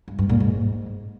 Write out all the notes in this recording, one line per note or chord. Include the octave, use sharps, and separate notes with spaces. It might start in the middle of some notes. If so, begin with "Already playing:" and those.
G2
G2
A#2
G#2